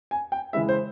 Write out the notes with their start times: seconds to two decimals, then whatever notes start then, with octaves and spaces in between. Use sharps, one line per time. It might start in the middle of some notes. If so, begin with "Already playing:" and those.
0.11 G#5
0.32 G5
0.53 C#3 E3 G#3 E4 E5
0.69 C5